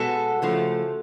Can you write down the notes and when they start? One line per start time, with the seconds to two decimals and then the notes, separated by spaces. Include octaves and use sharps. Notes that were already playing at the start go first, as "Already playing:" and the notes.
Already playing: B2 G#3 B3 F#4 A4
0.42 C#3 F3 A3